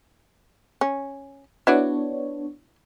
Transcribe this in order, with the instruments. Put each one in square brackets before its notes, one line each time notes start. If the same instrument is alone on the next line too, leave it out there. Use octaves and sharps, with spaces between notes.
[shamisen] C#4
[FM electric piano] B3 D4 C#5 [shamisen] E4 F#4 D5